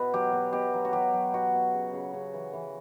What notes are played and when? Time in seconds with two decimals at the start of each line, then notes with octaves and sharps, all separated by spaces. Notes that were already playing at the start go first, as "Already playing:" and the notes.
Already playing: B2 E4 B4
0.14 F#3 G4
0.33 B2
0.53 B2 G4
0.74 F#3
0.85 F#4
0.93 F#3 G4
1.13 F#3
1.33 B2 F#4
1.54 B2
1.73 C#3
1.93 C#3
2.14 C#3
2.34 E3
2.53 E3